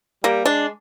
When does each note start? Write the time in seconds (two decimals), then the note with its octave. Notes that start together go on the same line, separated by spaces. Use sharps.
0.24 G3 A#3
0.45 G#3 D4